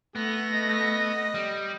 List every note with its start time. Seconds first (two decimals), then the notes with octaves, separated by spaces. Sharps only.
0.16 A3 B3 A#6
0.54 D#5
1.35 G3